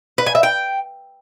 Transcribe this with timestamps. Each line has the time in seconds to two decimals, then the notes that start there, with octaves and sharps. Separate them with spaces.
0.18 B4
0.26 G#5
0.35 E5
0.43 G5